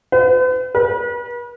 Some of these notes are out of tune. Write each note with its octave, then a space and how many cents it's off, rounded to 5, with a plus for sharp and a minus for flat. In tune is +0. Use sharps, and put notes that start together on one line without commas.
B4 +45
B4 -40